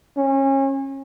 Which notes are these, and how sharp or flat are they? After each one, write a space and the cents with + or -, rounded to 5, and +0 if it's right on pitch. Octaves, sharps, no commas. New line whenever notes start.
C#4 -30